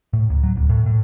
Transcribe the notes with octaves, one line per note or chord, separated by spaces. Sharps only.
A2
C#2
F#3
D1
A2
A2